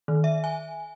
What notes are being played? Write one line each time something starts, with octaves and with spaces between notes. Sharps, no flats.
D#3
E5
G#5